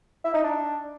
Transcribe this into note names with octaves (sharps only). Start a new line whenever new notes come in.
E4
D#4
D4